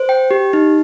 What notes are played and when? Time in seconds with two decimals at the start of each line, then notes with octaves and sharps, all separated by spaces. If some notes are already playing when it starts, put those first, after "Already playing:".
Already playing: C5
0.09 G5
0.31 G4
0.53 D#4